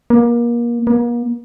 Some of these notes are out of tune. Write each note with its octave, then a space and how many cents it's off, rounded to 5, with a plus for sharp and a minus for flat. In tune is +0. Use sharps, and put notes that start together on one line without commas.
A#3 +30
A#3 +40